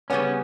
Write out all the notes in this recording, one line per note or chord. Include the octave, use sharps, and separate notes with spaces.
C#3 G3 B3 C#4